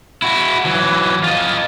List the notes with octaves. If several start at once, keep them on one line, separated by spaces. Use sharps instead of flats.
E4 F#4
E3 F#3
F4 D#5